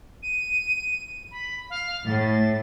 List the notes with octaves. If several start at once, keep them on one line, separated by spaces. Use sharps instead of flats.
D#7
B5
F5
A2 A6